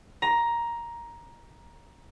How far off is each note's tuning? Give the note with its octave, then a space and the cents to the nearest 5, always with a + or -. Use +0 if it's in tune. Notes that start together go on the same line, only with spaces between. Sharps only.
A#5 +10